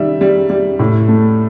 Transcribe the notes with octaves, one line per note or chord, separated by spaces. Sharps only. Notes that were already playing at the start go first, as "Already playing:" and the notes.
Already playing: D#3 G3 E5
G3
G3
A2
A3